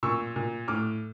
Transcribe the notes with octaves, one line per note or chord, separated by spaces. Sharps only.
A#2 C#6 E6
A#2
A2 D6 F6